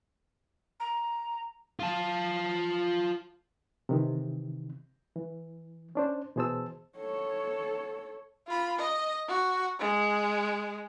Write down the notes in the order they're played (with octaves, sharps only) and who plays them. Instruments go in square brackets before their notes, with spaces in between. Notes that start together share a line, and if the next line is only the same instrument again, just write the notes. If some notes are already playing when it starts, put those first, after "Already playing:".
[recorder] A#5
[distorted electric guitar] F4 A5
[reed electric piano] C3 D#3 E3
E3
C#4 D4 C5
B2 E3 G#4 C5 A5 E6
[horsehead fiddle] A4 C#5
[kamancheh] F4 B5
D#5
F#4
G#3